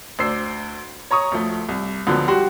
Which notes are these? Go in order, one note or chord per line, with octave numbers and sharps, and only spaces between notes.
D2 D4 C5 E6 C7
C#5 A#5 C#6 D#6
D2 F3 A3
C2
C#2 D3 F3 F#3 B3
G3 F#4 G4 C6